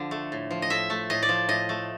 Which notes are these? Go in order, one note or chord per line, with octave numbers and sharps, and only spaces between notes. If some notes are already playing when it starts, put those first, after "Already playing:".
Already playing: D3 F3
A3
A2
F3
D#5
A2 E5
A3
A2 D#5
D5
F3
A2 D#5
A3